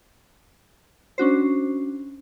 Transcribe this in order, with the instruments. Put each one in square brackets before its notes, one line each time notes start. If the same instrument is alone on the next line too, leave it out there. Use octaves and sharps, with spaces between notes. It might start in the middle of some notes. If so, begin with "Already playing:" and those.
[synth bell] C#4 D4 F#4 C5